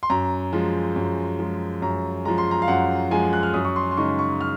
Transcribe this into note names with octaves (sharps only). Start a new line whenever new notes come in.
C6
F#2 A#5
F3 G#3
F#2
F3 G#3
F#2 A#5
F3 G#3 A#5
C6
A#5
F5
F#2 F#5
F3 G#3 G#5
F#6
F6
F#2 D#6
C#6
C6
C6
C#3 G#3 D#4 C#6
C#6
F6